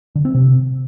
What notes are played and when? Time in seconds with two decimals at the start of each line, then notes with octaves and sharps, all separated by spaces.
0.15 D3
0.25 C4
0.34 C3